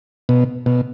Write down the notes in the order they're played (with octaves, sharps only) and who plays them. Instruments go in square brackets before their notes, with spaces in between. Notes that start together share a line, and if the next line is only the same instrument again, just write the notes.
[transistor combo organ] B2
B2